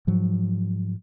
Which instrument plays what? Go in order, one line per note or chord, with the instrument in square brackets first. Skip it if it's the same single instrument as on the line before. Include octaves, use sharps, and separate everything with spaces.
[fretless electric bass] G#2 F3 F#3